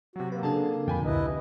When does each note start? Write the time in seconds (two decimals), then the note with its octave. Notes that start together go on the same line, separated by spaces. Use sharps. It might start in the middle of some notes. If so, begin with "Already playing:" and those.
0.16 C3 F#3 F#4
0.32 A#3 B4
0.43 C#3 D4 G#4 A4 A5
0.88 F2 A#2 D3 G5 G#5 B5
1.05 C#2 C3 E4 B4 D#5